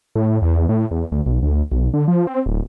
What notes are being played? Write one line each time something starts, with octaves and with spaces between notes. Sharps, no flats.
A2
E2
A2
E2
D2
B1
D2
B1
D3
F3
C4
D1